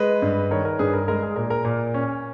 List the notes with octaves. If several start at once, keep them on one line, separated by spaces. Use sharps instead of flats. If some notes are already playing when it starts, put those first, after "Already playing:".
Already playing: G#3 B4 D#5
G2
D#3 A#4 C#5
A#4
G2 G#4 B4
A#4
G#3 A#4
G#4
A#2 A#4
A#4
A#2
C#4